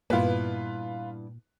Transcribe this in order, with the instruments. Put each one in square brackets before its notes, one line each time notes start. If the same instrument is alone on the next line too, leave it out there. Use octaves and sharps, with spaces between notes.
[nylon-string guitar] G2 B3 E4 [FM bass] A#2 [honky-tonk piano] F4 B4